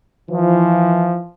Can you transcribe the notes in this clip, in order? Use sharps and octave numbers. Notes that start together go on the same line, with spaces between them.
E3 F3